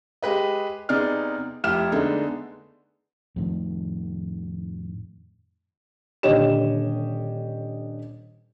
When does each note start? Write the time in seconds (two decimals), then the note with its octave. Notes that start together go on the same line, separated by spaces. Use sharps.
0.22 G#3 G4 B4 D#5
0.89 C3 B3 D#4 G#4 D5 F6
1.64 F1 E4 G4 F6 E7
1.92 D3 G#3 A3 B3 D4 D#4
3.36 F2 A2 D#3
6.23 D#1 D3 G4 C#5 D#5 E7